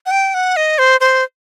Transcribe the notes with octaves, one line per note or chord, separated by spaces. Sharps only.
F#5
G5
F#5
D#5
C5
C5